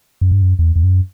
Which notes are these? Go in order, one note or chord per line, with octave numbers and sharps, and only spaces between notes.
F#2
G2
F#2
E2
E2
F#2